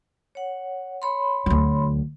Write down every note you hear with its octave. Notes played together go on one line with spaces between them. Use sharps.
C#5 F#5
C#5 B5 C6
D2 F#3